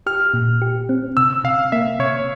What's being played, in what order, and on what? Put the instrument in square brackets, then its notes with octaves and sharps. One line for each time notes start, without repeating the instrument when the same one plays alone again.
[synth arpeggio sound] G4 [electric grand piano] F6
[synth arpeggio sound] A#2
G4
C4
[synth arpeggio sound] C3 [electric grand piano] E6
[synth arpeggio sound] C3 [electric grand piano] F5
[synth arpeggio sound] A#3 [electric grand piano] E5
[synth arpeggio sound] C3 [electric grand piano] C#5